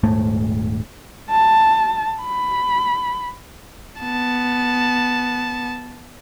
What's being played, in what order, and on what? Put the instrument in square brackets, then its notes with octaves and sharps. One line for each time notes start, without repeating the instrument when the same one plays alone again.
[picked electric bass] D#1 G#2 A3
[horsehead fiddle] A5
B5
[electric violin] B3 A5